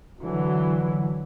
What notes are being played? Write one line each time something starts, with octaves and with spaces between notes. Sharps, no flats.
D3 E3 F#3